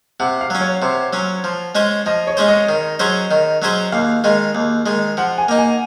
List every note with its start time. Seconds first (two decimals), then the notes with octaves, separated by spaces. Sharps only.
0.20 C3 F#5
0.41 F5
0.50 F#3 C#4
0.61 C#5
0.82 C3 C5
1.13 F#3 C#4
1.44 F3
1.75 G#3 C#4 G#4 C5
2.06 F3 D#5
2.27 C#5
2.37 G#3 C#4 G#4 C5
2.48 D#5
2.69 D#3
2.99 F#3 C#4 G#4 C5
3.31 D#3
3.62 F#3 C#4 G#4 C5
3.92 D#2 F5
4.24 D#3 G#3
4.55 D#2
4.86 D#3 G#3
5.17 F3 F#5
5.38 G#5
5.49 A#3 D#4
5.58 G#5